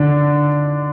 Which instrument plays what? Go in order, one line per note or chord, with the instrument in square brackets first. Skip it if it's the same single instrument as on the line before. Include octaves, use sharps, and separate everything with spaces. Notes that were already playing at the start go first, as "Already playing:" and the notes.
Already playing: [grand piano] D3 D4